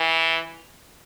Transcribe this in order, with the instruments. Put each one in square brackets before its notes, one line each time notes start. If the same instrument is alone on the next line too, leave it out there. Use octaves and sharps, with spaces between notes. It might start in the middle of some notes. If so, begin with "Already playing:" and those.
Already playing: [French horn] E3